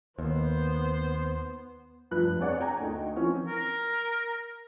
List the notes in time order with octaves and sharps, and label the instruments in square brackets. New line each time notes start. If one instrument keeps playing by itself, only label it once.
[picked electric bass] D#2 [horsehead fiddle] B3 [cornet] C5
[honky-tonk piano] F1 G2 F3 B4 F#6
C4 D4 G#4 C#5 D5 F#5
G5 G#5 A#5 G#6
D2 A3 D#4
E3 F3 C4 C#4
[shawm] A#4